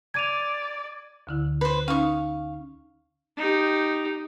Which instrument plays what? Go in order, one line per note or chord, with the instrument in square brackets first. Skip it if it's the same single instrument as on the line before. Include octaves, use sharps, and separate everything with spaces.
[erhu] D5 [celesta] G#6 D#7 F7
[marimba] D2 D3 E4
[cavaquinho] B4 C5
[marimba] C#4 D#4 [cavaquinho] F5 C#6
[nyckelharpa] D#4 G4